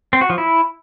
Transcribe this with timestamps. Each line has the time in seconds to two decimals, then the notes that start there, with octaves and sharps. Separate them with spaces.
0.13 C4
0.21 F#4
0.30 F3
0.38 E4